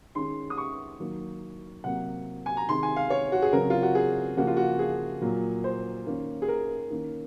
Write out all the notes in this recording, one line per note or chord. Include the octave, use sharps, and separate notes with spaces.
D#3 G#3 C#4 C6
D#6
C#6
D#3 F#3 A#3
C3 F#3 A#3 F#5
G#5
A#5
C3 D#3 G#3 C6
G#5
F5
C#5
F#4
G#4
C#3 F#3 C4 A#4
F4
F#4
G#4
C#3 F3 A#3 F#4
F4
F#4
G#4
A#2 F#3 A#3
C5
D#3 A#3 C#4
G#4
A#4
D#3 A#3 C#4